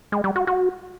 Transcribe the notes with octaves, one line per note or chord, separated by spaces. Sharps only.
G#3
G3
F#4
F#4